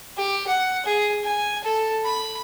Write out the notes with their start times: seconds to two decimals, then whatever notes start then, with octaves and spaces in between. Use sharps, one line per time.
0.17 G4
0.47 F#5
0.86 G#4
1.24 G#5
1.64 A4
2.05 B5